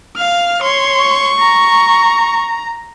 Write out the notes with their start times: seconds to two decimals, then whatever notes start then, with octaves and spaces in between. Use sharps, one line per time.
0.17 F5 F6
0.62 C#5 C6
1.02 C#6
1.40 A#5